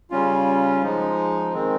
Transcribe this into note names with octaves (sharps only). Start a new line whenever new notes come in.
C#3 G3 C#4 F4
F3 G#3 D#4
D#3 G#3 C4